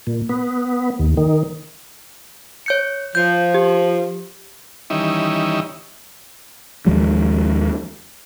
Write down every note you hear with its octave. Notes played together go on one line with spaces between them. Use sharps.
A#2
B3
D#2
D#3
C#5 G6 C#7
F3 G6
G4
D#3 E3 G3 C#4 D#4 E4
D#2 F3 F#3 G#3